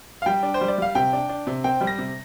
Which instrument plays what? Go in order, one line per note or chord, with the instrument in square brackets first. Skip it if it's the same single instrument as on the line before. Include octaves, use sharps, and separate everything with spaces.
[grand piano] F5
G3 G5
D4
C5
G3
D5
G3 F5
C3 G5
D4
D4
C3
C4 G5
G3
A#6
C3